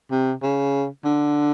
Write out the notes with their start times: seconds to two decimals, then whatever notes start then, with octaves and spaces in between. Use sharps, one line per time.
0.11 C3
0.42 C#3
1.04 D3